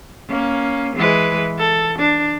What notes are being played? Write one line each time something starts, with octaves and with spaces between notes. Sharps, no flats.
A#3 C#4
E3 G#3 B4
A4
D4